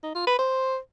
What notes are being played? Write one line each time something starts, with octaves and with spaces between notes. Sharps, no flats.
D#4
F4
B4
C5